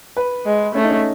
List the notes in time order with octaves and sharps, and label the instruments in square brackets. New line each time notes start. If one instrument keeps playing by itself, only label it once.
[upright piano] B4
[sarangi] G#3
[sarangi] A3 [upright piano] C#4
[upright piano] D#4
C#4